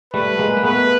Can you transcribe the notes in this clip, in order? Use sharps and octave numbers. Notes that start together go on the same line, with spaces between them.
G3 A3 B4
G#3 A#3
A#3
A3 B3 B4